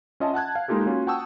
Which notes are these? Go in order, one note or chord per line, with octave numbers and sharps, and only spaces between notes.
C#4 F4 D#5 E5 A5
F#5 A5 F#6 G#6
F5
G#3 A#3 D#4 F4 G4 A4
A#3 C#4 F4 F#4
F#5 G5 A5 C#6 D#6 E6